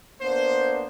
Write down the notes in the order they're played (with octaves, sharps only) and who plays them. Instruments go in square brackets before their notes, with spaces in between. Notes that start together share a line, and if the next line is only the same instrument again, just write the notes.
[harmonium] A#3 B3 D4 [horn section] C5